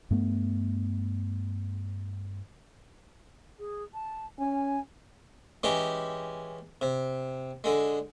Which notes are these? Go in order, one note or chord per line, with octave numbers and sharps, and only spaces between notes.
G2 A3 B3
G#4
A5
C#4 G#5
E3 G#3 C#4 G4
C3
D3 G#3